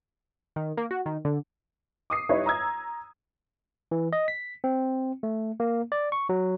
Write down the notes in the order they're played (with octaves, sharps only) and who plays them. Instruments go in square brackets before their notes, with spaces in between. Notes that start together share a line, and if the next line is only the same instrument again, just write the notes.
[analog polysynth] D#3
A#3
F#4
D#3
D3
[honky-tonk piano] D6 D#6 C7
G3 D#4 E4 B4 C#5 E5
A#5 D#6 E6 G#6
[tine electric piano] E3
D#5
B6
C4
A3
A#3
D5
C#6
F#3